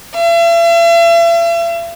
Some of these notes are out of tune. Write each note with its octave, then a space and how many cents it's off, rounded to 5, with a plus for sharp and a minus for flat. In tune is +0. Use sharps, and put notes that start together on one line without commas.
E5 +45